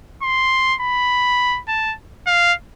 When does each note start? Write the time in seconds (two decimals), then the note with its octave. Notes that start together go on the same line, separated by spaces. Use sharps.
0.22 C6
0.81 B5
1.68 A5
2.27 F5